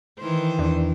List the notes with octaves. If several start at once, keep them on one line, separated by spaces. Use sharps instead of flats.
D#3 E3 C5
E2 D4